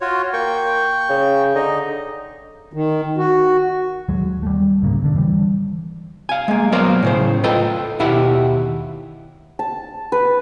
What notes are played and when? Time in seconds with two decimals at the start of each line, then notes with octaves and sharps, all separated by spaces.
0.01 F4 F#4 C#5
0.33 A#3 G5 C#6
1.09 C#3
1.55 D3 D#4 D#5
2.73 D#3
3.17 F#4
4.09 D#2 F#3 G#3
4.43 G3 A3
4.82 C#2 G#2 C#3 A#3
5.02 E1 D3 D4
5.16 E3 G3
6.29 F5 G#5
6.48 G#3 A#3
6.72 F#3 B3 A#4 C5 D5 F5
7.03 A2 C#3 C5
7.44 F4 A4 B4 D#5 G5
7.99 D#2 B2 E4 G4 E5 F#5
9.59 A5
10.12 B4